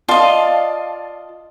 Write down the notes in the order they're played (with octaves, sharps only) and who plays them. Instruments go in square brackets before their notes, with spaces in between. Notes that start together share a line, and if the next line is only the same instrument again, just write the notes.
[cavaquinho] F4 D#5 [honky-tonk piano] D5 F5 A5